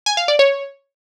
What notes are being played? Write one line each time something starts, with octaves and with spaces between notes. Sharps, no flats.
G#5
F5
D5
C#5